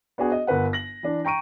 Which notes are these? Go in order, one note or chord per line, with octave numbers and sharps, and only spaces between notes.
B3 D4 F#4 G#4
D#5
G1 A#4 B4 F#5
A#6 F#7
E3 D4
G5 A#5 C#6 D7 D#7